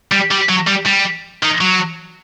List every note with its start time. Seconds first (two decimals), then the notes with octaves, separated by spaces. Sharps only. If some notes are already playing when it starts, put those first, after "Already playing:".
0.12 G3
0.31 G3
0.49 F#3
0.67 G3
0.86 G3
1.43 D#3
1.61 F#3